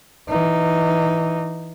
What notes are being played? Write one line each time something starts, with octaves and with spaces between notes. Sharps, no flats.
E3 D#4